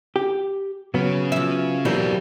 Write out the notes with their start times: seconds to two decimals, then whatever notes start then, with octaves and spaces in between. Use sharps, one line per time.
0.16 G4
0.94 C#3 F#3 B3 C#4
1.32 F3 E5
1.85 B2 E3 F#3 G3 A#3 C4